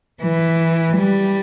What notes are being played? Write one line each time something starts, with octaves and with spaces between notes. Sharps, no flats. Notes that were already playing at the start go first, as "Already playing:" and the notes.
E3
G3